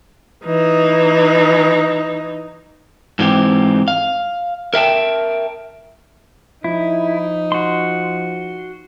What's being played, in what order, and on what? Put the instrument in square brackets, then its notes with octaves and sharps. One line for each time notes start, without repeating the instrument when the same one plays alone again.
[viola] E3 D#4
[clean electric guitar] G#2 E3 C4 G4
F5
A#4 E5 G5 A5
[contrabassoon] F3 [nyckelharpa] D#4 [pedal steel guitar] E4
[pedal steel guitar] F#4 C6